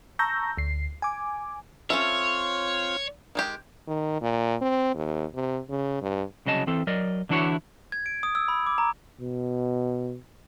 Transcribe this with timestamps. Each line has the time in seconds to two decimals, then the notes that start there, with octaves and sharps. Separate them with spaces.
0.19 A5 A#5 C#6 E6 G6 A#6
0.58 D2 C7
1.02 G#5 D6
1.90 C4 C#4 F4 A4 C#5 E5
3.35 D#3 G#3 G4
3.88 D#3
4.21 A#2
4.61 C4
4.95 D#2
5.35 C3
5.69 C#3
6.02 G2
6.46 C2 C#3 F#3 D#5 A5
6.67 E3 C4 A4
6.87 F#3 A#4 D5 D#5
7.29 D3 E3 D4 E4 F#4 C#5
7.92 G#6
8.06 D7
8.23 D#6
8.35 E6
8.48 B5
8.67 D6
8.78 A#5
9.20 B2